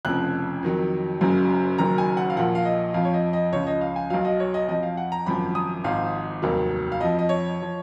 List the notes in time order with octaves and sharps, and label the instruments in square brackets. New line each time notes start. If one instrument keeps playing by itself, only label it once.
[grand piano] F1 F2 C#3 F3 F#6
F2 D#3 F#3
F#1 F#2 C#3 F#3
F#1 F#2 D#3 F#3 A#5
G#5
F#5
F5
A#1 A#2 F3 F#5
F5
D#5
F2 F3 F5
C#5
D#5
D#5
C#2 C#3 F3 C#5
D#5
F5
G#5
B1 B2 F#3 F5
D#5
C#5
D#5
F2 F3 D#5
F5
F#5
A#5
G#1 F#2 F3 B5
D#6
G#1 G#2 F3 F5
F1 D#2 D#3 F#3
F5
F2 F3 D#5
D#5
C#5
F3